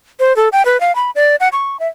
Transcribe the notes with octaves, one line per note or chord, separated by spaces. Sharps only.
C5
A4
G5
B4
F5
B5
D5
F#5
C#6
E5